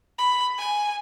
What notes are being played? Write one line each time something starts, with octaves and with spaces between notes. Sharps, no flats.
B5
G#5